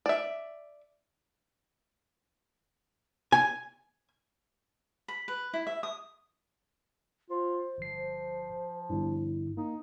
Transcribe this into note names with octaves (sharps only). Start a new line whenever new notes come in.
D5 E5
G#5
B5
B4
E4
E5
D#6
F4 C5
G1 F3 C7
G1 G2 E4
A#3 D#4